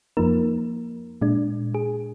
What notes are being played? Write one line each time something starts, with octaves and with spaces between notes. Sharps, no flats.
F2 F3 A#3 D#4 A#4
A#2 G#3 D4
G#4